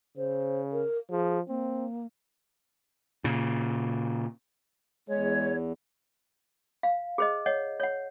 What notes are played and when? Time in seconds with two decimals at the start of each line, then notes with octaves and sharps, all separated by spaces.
0.17 C#3 C5
0.72 A#4
1.10 F3 G#4
1.48 A#3 C4
3.24 A#2 C#3
5.09 E2 G#3 C#5
6.83 F5
7.18 G#4 C5 D#5
7.46 C#5 D#5 F#5
7.80 C#5 F#5